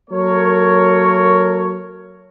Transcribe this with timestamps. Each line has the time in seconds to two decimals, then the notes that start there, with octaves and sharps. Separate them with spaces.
0.10 F#3 A#3 A4 A#4 C#5